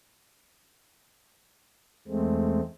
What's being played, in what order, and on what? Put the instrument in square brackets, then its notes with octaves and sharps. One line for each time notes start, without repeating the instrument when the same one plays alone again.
[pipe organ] E2 G#3 A3 C4